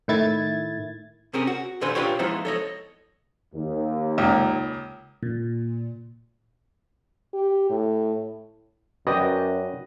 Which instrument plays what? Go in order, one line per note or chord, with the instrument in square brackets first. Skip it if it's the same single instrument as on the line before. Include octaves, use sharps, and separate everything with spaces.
[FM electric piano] A2 D#3 E4 G#6 A6
[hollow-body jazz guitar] C3 C4 C#4 G#4 A#4
F#4
D#2 A#2 D3 B4 C5 G#5
A#2 D4 F4 G4 B4 C#5
F3 G#3 B3 D#4 E4 C5
A4 C#5 D#5
[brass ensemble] D#2
[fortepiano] C#2 A#2
[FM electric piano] A#2
[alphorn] G4
A2
[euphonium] F#2 [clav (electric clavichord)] F#4 D5 G5 [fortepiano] B4 D#5